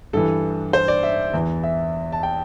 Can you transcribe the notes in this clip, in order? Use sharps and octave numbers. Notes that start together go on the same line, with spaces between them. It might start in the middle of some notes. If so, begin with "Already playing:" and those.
G2 E3 A4
C5
D5
E5
E2 E3
E5
A5
G5